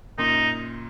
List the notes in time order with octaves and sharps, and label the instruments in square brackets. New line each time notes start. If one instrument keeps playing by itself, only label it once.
[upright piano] F#2 A#2 [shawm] D#4